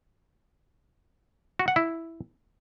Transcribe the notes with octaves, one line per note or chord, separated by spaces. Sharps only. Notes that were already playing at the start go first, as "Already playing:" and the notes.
F#4
F#5
E4